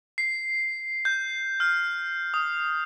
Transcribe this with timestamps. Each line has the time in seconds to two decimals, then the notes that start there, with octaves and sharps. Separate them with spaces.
0.18 C7
1.05 G6
1.60 F6
2.34 D#6